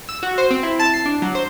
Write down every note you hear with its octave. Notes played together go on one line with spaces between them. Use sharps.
E6
F#4
C5
C4
E4
A5
C7
D4
F#3
C5